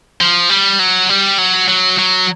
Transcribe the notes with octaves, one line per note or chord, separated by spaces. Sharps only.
F3
G3
F#3
G3
F#3
F#3
F#3